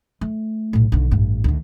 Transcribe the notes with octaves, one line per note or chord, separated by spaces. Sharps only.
A3
B1 A2
B1 D3
A1 G2
D2 D#3